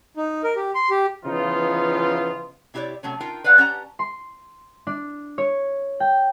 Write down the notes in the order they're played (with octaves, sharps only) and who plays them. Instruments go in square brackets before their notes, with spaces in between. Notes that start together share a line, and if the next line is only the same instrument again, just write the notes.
[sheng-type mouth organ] D#4
A#4
G4
C6
G4
[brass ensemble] C#3 E3 F3 B3 D#4 F4
[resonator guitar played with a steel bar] C3 E4 G4 C#5 D5
C3 F#3 A3 C#4
D#4 F4 A#4 G5
B4 D5 F5 F#5 A#5
C#4 G4 F#5 A5 A#5
[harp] C6
D4
C#5
G5